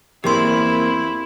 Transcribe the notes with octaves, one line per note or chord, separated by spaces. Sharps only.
E2 A#3 C4 E4 G4 C6